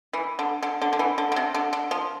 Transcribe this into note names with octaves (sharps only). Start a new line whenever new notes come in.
E3
D3
D3
D3
D3
E3
D3
D3
C3
D3
D3
F3